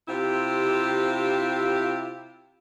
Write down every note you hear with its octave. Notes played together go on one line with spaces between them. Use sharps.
C3 C4 E4 F4 G4